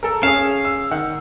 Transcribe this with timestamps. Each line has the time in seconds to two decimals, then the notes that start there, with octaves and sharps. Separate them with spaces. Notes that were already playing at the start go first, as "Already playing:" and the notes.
0.03 A4 A#4
0.23 C#4 G#4 F5 E7
0.65 E6
0.91 D#3 F#5